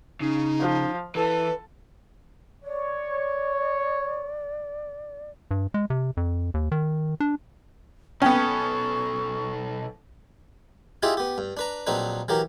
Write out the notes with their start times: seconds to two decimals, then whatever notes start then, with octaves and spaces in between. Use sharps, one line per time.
0.21 C#3 D#4
0.60 F3
1.15 E3 A4 B4
2.64 C#5 D5
5.51 G2
5.74 G#3
5.90 C3
6.17 F2
6.54 D#2
6.72 D#3
7.20 D4
8.22 B1 B3 C#4 A4 G5 C#6
11.03 E4 F4 G4 G#4 D#5 E5
11.17 B3 G4
11.38 G2
11.57 D4 B4 A#5
11.87 A#1 F#3 C4 D4 D#4 B4
12.28 E3 F#3 G4 A#4